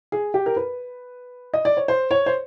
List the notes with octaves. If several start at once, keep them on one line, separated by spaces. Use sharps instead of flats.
G#4
G4
A#4
B4
D#5
D5
C#5
C5
C#5
C5